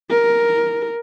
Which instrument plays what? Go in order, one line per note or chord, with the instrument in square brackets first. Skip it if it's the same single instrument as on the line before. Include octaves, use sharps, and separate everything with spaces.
[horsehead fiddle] A#4